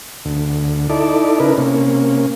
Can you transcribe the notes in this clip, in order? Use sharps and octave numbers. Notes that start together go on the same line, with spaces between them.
D2
D#4 E4 A4 D5
C#3 D#4 E4 A#4 B4
C3 A#3 C#4